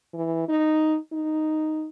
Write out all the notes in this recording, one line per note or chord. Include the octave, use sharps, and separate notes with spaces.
E3
D#4
D#4